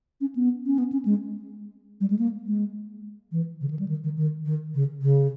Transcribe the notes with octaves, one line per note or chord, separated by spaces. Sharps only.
C#4
B3
C#4
B3
C#4
G#3
G3
G#3
A#3
G#3
E3
C#3
D#3
G3
D#3
D#3
D#3
D#3
C#3
C#3